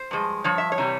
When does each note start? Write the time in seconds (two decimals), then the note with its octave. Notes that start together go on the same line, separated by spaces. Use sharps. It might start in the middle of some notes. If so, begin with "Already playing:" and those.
Already playing: C5
0.11 G2 F3 G#3
0.44 G2 F3 C#5
0.58 E5
0.72 C#5
0.78 C3 E3 G3